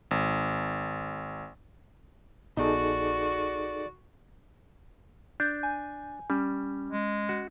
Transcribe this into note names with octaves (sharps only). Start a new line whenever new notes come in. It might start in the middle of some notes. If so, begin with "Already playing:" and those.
G#1
A#1 B3 D#4 F#4 G#4 A4 D5
D4 G6
G#5
G3 C#4
G#3
F#4